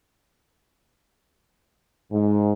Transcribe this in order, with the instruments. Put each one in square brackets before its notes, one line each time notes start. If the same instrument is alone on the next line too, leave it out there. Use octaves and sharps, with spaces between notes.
[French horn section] G#2